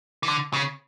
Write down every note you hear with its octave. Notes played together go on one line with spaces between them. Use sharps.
E3
D3
C#3